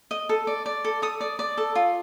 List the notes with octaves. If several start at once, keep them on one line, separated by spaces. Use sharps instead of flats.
D#5
A4
D5
D5
A4
A4 D#6
D5
D5
A4
F4